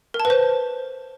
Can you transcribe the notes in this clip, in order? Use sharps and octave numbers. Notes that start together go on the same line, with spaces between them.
A#4
A5
B4
C5